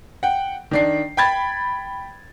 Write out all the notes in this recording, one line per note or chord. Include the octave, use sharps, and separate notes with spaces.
F#5 G5
D#3 D4 C7
G5 B5 G#6 A6